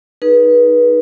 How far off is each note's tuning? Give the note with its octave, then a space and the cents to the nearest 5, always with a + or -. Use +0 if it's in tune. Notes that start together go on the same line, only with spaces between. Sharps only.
D#4 +0 G#4 +15 B4 -30